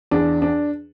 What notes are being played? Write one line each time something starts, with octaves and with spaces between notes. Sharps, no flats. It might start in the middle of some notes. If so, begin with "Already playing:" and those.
E2 D4
D4